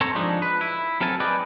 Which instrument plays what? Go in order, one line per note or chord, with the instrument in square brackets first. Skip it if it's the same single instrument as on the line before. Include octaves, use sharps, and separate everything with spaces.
[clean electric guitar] C4 A4 C5 C#5 A#5
F3 G#3 D4 D#4
B4
E4
F#3 C4 A4 A#4 G#5 A5
G#4 B4 D5 D#5 G5